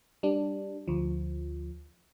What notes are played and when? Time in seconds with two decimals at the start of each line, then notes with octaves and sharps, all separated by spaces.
0.23 G3 D4
0.88 D2 F3